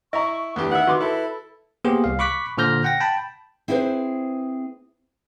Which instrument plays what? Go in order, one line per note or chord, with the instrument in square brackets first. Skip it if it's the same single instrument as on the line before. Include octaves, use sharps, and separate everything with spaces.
[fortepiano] E4 [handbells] D#5 A#5 [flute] C#6
[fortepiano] E2 G4 [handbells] A3 D4 [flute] B4
[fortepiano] D#3 E4 E5 [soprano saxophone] F#5
[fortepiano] D#3 [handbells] F#4 C6 D6 [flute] B4
[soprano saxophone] E4 [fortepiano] A4
[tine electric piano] A#3 B3 G4 G#4 C5
C2 F5
B5 C#6 D6 F#6 B6
A#2 D3 C5 F6 G6 A#6
F#5 G5 A#6
G5 A5 B5
[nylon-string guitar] C4 E4 G#4 A4 B4 C5